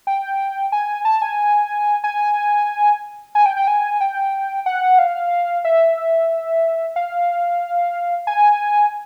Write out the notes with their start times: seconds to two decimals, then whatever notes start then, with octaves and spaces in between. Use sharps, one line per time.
0.07 G5
0.72 G#5
1.05 A5
1.22 G#5
2.04 G#5
3.35 G#5
3.46 G5
3.57 G5
3.68 G#5
4.01 G5
4.66 F#5
4.99 F5
5.65 E5
5.97 E5
6.96 F5
8.27 G#5